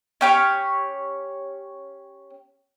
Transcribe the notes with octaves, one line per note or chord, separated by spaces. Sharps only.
C#4 G4 C#5